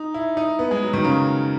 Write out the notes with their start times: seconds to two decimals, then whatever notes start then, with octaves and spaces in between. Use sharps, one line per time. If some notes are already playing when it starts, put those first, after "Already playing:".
Already playing: D#4
0.14 E4
0.37 D#4
0.59 B3
0.71 G#3
0.83 F#3
0.93 D#3
1.04 C#3